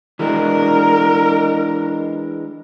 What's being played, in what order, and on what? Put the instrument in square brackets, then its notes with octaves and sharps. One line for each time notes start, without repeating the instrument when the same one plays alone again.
[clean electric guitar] E3 G#3 D4 [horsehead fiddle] A#4